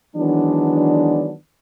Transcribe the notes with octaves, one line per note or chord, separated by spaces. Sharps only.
D#3 E3 F#3 G#3 B3 D4